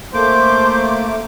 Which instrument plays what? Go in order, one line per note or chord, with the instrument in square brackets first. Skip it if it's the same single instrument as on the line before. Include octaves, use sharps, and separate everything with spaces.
[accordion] A3 A#3 D6 [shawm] C5